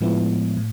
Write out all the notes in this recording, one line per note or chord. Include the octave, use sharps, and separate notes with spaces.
A2 F3 G#3 B3 E4
A2